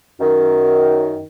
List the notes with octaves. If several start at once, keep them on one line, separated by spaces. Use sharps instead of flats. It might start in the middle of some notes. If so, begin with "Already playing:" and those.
F#2 D#3